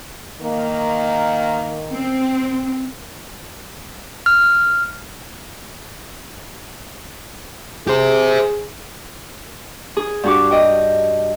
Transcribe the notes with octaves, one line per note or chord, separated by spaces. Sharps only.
D#3 A#3
C4
F6
G4 G#4 C5
G#4
G2 F#4 D6
D#5 G5